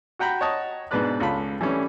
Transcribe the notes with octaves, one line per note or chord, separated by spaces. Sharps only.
F#4 F#5 G5 A#5 B5
C#5 D#5 F#5 A5 D#6
G#2 B2 D4 B4 D5 F#6
C#2 F4 A4 B5
E3 G3 A3 C#4